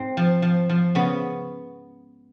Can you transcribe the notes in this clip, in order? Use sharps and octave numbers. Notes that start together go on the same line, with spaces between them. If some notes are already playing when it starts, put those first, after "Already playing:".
Already playing: G#2 C4
F3
F3
F3
C#3 B3